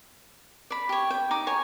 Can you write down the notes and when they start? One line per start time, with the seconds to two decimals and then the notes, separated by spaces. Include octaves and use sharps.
0.70 D5 B5
0.89 G4 C#5
1.10 G5
1.31 D#4 D6
1.47 C#5 G#5